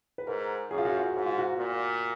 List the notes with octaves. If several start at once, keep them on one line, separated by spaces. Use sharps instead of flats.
B4
G#2 A#4
F#2 G#4
F4
F#4
F4
G#2 F#4
F4
F#4
A#2